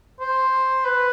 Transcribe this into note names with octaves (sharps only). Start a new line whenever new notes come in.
C5
B4